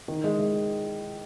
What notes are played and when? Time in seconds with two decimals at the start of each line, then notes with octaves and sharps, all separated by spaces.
0.08 D#3
0.24 G#3
0.39 G#3